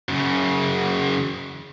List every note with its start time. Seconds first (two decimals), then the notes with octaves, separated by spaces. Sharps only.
0.09 F#2 C#3